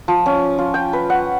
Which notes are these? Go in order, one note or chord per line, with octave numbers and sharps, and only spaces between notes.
F3
C#4
F4
G5
B4
F#5